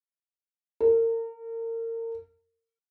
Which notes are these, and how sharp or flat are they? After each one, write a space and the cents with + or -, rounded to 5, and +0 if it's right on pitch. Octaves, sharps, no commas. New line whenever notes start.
A#4 -35